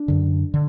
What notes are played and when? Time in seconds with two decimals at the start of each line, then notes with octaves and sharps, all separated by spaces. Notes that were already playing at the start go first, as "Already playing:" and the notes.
Already playing: D4
0.08 F#2 D3
0.54 D3